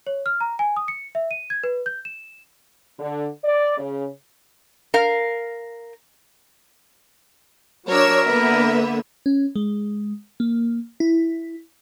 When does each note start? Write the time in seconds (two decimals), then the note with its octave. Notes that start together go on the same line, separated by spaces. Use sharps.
0.07 C#5
0.26 F6
0.41 A#5
0.59 G#5
0.76 D#6
0.88 C#7
1.15 E5
1.31 D#7
1.50 G#6
1.64 B4
1.86 G6
2.05 E7
2.99 D3
3.44 D5
3.78 C#3
4.94 A#4 F5
7.89 F#3 D4 A#4 C#5 E6
8.26 D3 A#3 B3 E5
9.26 C#4
9.56 G#3
10.40 A#3
11.00 E4